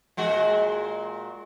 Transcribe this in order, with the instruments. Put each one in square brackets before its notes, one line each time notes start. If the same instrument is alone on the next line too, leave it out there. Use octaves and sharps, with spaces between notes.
[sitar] A#2 G#3 F#4